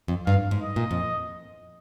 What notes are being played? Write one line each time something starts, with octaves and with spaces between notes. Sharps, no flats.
F2
G2 F5
G#2
D#5
A#2
F2